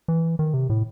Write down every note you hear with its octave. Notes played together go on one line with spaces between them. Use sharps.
E3
D#3
C3
A2